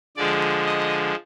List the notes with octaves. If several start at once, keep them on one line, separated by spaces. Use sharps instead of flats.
D3 F3 G#3 D5
D#5